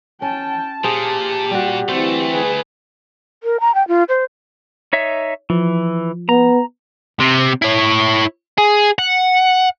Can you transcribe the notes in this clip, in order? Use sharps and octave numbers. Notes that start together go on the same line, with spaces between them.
C#4 G5 A5
A#2 G4 G#4 C5
G3 F#4
D2 E3 A3 C4 C5
G#4 B4
A#4
A#5
G5
F4
C5
D#4 C#5 E5
E3 F3
B3 A#5
C3
E4 C#5
G#4
F#5